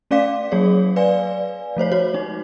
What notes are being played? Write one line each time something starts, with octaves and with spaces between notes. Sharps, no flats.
A3 C#4 D5 F5 D6 B6
F#3 A#3 G#4 C#5
B4 D5 F5 G#5
F3 A3 C5 C#5
F#4 C#5
G#3 D#4